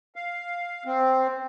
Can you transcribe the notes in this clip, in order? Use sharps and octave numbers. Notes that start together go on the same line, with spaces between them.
F5
C4